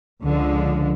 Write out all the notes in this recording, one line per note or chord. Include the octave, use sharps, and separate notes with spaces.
C#2 D3 F3